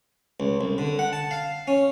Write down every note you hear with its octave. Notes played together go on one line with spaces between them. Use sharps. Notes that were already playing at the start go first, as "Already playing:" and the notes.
C#2
C2
D3
F#5
A5
F5
C#4